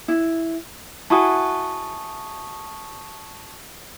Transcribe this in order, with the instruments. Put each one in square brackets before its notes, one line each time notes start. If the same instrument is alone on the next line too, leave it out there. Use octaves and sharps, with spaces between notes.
[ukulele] E4
[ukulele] E4 F#4 G#4 [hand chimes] A5 C#6 D#6